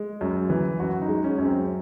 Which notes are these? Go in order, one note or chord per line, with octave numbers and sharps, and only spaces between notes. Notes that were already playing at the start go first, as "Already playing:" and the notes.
Already playing: G#3
F#2
E3
F#2 F#4
D#4
G#3
C#4
F#2
C4